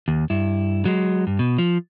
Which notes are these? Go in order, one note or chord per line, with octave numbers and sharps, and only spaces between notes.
D#2
G2 E4
F#3 G#3
G2
B2
F3